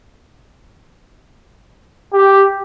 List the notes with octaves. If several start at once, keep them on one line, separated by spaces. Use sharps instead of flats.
G4